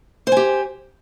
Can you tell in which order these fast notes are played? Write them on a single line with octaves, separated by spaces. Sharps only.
C5 G#5 G4